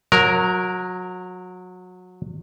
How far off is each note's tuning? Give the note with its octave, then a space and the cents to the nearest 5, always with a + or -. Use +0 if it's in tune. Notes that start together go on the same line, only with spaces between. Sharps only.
F#3 -25 A#4 +0